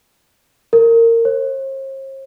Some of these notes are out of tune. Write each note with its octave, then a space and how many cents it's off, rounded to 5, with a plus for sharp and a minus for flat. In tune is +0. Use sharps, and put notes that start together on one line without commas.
A#4 -25
C5 +45